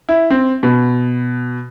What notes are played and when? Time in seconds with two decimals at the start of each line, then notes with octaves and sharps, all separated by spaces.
0.09 E4
0.30 C4
0.63 B2